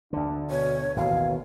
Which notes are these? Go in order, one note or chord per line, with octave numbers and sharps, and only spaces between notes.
D2 D3 D4
B2 C#5
A1 D#2 B2 F5